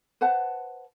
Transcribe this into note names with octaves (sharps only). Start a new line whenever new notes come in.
B4 C5 F#5 A5